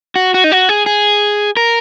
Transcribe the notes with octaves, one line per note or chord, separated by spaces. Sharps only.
F#4
F#4
D#4
F#4
G#4
G#4
A#4